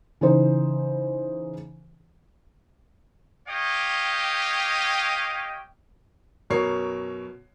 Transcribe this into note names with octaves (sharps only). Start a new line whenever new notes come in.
C#3 E3 D#4 C5
G4 C#5 D#5 F5 G5
F#2 B2 A#4 C#5 C7